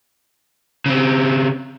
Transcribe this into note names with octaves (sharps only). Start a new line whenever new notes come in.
C#3 C4